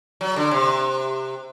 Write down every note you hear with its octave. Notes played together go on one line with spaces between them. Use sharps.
F#3
D3
C3